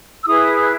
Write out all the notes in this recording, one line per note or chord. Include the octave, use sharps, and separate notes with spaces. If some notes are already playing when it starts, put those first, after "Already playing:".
E6
E4 G#4 B4 D#6